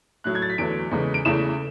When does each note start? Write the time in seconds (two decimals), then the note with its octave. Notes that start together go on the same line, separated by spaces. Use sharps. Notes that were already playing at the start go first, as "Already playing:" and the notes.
0.24 A2 F#3 A3 F#6
0.35 G#6
0.42 A6
0.50 B6
0.58 E2 D3 F#3 A3 D7
0.91 E2 C#3 G#3
1.14 D7
1.25 E2 C#3 E3 A3 E7